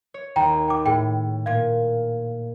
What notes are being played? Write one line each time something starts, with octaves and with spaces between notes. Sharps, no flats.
C#5
D#2 G5 A#5
G5 D6
A2 G#4 G5
A#2 F5 G#6